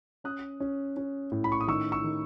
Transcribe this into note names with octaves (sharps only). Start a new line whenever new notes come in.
C#4 D#6 F#6
C#4
C#4
A2
B5
C#6
D#6
D#3 C#6 E6
C#6 E6
D#3